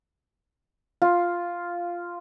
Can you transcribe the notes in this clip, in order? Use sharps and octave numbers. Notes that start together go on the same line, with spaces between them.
F4